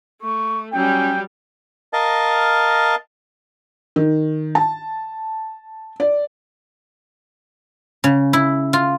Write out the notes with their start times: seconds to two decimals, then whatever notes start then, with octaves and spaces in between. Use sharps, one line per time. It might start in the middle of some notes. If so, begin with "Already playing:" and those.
0.21 A3 C#6
0.73 F#3 G3 C#4 G5
1.93 A#4 D#5 F5 A5
3.96 D#3
4.55 A5
6.00 D5
8.04 C#3
8.33 E4
8.73 F4